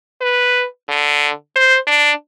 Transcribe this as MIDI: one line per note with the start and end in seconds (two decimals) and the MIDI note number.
0.21 0.65 71
0.89 1.30 50
1.56 1.77 72
1.87 2.11 62